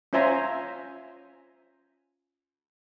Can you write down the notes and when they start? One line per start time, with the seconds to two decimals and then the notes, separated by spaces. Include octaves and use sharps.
0.13 C#4 F4 C5 E5 G#5 A#5